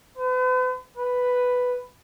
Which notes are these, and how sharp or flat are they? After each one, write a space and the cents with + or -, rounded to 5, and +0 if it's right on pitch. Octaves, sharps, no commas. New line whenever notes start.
B4 +45
B4 +5